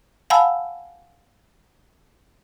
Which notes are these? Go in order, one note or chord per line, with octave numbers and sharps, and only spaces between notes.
F5 F#5 G#5 A5 B5 E6